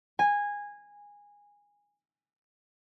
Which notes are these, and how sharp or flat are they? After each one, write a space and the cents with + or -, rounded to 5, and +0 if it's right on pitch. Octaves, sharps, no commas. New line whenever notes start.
G#5 -15